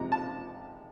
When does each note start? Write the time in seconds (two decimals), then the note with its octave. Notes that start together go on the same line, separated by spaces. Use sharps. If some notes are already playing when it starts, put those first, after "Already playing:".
Already playing: F2 C3 F3 G#3 A#5
0.12 A5